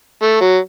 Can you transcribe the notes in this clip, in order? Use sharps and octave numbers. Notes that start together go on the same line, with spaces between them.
A3
F#3